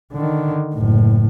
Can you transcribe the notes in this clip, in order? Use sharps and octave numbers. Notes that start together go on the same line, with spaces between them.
D3 D#3
F#1 A2